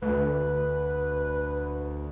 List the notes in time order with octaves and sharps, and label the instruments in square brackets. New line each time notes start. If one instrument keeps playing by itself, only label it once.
[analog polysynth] D2 [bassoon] B4